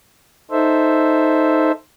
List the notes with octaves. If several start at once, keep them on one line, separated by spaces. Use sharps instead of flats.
D#4 A4 C5 E5